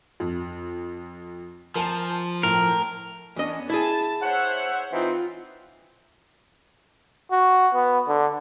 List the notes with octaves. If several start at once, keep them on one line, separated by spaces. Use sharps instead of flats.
F2
F3 A#4 G#5 A5
A2 A#4
E2 B3 C#4 D4 D#5
E4 G#4 A5
C5 C#5 E5 F#5
E3 C4 D#4 F4
F#4
B3
D3